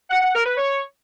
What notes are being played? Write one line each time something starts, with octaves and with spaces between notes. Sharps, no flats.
F#5
F#5
A#4
B4
C#5